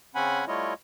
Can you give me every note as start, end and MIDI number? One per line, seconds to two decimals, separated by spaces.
0.15 0.45 49
0.15 0.45 60
0.15 0.45 61
0.15 0.45 78
0.15 0.45 80
0.15 0.45 83
0.48 0.74 55
0.48 0.74 57
0.48 0.74 64
0.48 0.74 65
0.48 0.74 73
0.48 0.74 75